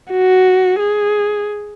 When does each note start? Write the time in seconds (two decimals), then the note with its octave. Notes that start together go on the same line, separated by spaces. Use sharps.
0.12 F#4
0.80 G#4